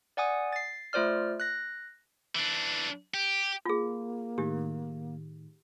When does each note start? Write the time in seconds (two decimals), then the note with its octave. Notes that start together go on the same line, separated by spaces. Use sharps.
0.17 D5 F#5 G#5 D#6
0.53 A6 C7
0.93 A3 F4 C5 D5 F6
1.40 F#6 A#6
2.35 E3 D4
3.14 G4
3.66 A#3 F4 G#4
4.38 A2 D#3 G4